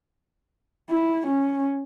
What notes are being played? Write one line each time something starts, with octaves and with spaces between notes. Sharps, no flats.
E4
C#4